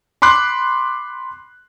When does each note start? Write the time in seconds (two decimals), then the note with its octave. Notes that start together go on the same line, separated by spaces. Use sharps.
0.22 B5 C6 D6 F#6 C7